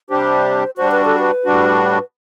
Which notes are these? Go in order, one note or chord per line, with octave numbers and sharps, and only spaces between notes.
C3 G3 D4 G4 C5
G3 D4 F#4 C5
B4
A4
B4
A2 G3 D4 F#4